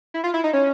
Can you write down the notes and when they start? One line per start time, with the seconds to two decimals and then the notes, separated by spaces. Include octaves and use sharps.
0.14 E4
0.24 F4
0.34 E4
0.44 D#4
0.53 C#4